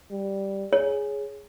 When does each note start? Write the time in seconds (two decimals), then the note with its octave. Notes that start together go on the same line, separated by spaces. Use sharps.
0.11 G3
0.73 G#4 C#5